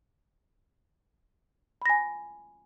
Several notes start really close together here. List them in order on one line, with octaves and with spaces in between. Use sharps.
B5 A#6 G#5